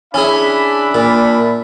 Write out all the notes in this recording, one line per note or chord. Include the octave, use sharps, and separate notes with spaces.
C#4 D4 E4 G#4 E5 B5
A#2